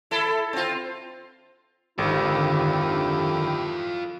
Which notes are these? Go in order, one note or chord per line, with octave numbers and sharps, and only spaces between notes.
E4 A4
C4 F4
G#1 D3 D#3 E4 F4 G4 A4